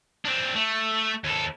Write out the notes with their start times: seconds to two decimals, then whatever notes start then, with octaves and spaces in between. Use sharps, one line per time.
0.25 C4 D4
0.55 A3
1.24 D#2 A4